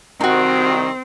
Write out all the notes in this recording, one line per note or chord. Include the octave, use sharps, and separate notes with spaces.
C2 D#3 C4 D#4 F#4